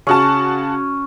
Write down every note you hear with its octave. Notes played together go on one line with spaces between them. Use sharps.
C#3 C#4 F#4 A5